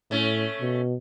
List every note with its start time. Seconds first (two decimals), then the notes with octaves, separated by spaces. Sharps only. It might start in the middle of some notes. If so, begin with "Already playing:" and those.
0.11 A2 A3 C#4
0.61 B2